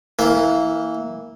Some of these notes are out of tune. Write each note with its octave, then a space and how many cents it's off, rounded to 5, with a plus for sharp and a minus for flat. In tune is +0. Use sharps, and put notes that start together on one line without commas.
E3 -15 A#3 +0